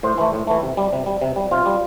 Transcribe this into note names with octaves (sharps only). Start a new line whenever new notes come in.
A2 C5
E3 A3
A2
E3 A3
C3
G3
C3
G3
C3
G3
C3 F4
G3